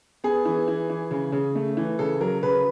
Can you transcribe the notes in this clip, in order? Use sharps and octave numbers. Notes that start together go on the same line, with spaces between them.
B3 G#4
E3
E3
E3
C#3
C#3
A3
E3
C#3 A4
F#3 A#4
C#3 B4